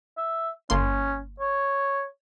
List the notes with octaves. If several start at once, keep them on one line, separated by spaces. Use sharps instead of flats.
E5
G1 A#3 C#4 C6
C#5